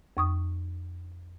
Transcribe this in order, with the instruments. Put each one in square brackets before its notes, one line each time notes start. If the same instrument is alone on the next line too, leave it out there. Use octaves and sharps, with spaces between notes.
[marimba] F2 C#6 D#6